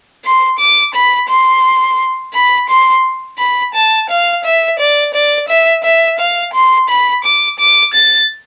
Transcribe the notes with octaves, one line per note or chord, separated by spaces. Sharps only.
C6
D6
B5
C6
B5
C6
B5
A5
F5
E5
D5
D5
E5
E5
F5
C6
B5
D6
D6
A6